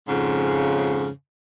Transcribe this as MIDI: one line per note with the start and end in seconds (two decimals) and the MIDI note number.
0.08 1.09 41
0.08 1.09 44
0.08 1.09 49